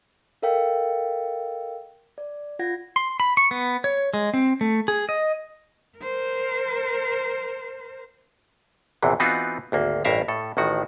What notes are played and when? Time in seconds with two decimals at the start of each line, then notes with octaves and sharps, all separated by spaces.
0.42 A4 A#4 D#5 F5 G5
2.18 D5
2.59 F4 F#5 G#6 A#6
2.96 C6
3.20 B5
3.37 C#6
3.51 B3
3.84 C#5
4.14 G#3
4.34 C4
4.61 A3
4.88 G#4
5.09 D#5
5.98 A#4 C5
9.03 A#1 E2 C3 E3
9.20 E3 B3 C4 D#4 F4 F#4
9.72 G#1 D2 A#3
10.05 A1 G2 A#4 E5 F5 A#5
10.28 A2 A4
10.57 A1 A2 D#3 F#4